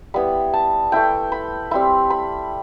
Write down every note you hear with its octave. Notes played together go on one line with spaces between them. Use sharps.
G3 B3 E4 B5
A5
A3 E4 G5
B5
G3 C4 E4 B5
B5